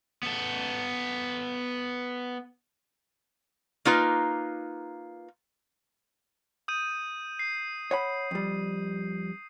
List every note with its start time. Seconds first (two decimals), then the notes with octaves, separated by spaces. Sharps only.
0.23 B3 A4
3.85 A#3 D#4 F4 B4
6.68 D#6 G6 D#7
7.39 C7
7.91 C#5 F#5 B5
8.31 F2 G3